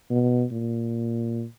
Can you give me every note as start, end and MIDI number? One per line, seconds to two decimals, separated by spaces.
0.11 0.45 47
0.51 1.44 46